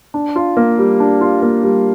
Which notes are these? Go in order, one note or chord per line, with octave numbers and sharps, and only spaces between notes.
D4
F4
A#3
G3
D4
F4
A#3
G3